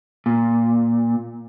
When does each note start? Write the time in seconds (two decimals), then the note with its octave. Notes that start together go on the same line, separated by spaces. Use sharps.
0.26 A#2